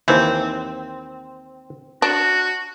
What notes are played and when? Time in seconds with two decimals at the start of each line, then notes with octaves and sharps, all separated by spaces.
0.08 D#2 E3 C4
2.02 D4 F#4